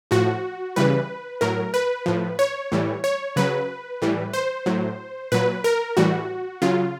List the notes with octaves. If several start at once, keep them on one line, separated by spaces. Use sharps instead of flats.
A2 F3 F#4
C#3 E3 G3 B4
A2 F#3 A#4
B4
A2 F3
C#5
A2 E3 G3
C#5
C#3 F#3 B4
A2 E3 G3
C5
A2 F#3
A#2 F#3 B4
A#4
A2 E3 G3 F#4
C#3 F#3 F4